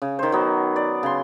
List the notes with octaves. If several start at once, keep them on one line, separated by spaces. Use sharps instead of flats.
C#3
D#3 C5
F#3 B3
D5
C#3 C6